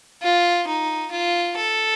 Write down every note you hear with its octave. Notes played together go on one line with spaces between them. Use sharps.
F4
D#4
F4
A4